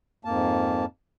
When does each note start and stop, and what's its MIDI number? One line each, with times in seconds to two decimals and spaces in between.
0.25 0.85 41
0.25 0.85 44
0.25 0.85 58
0.25 0.85 81